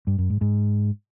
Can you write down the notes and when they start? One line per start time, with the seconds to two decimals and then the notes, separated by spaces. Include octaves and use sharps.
0.07 G2
0.18 F#2
0.30 G#2
0.41 G#2